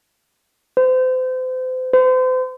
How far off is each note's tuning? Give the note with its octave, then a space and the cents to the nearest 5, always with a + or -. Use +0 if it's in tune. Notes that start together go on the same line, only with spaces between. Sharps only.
C5 -35
C5 -40